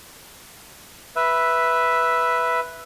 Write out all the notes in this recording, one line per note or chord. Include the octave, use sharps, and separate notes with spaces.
B4 E5